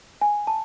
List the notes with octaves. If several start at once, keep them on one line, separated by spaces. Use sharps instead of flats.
G#5
A5